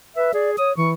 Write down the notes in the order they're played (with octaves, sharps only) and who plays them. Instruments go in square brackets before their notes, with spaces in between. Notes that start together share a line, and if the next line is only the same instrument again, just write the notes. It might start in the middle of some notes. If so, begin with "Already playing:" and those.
[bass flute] B4 [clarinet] E5
[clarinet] G#4 [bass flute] D5
[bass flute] C#5 [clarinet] D#6
[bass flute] E3 [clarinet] C#6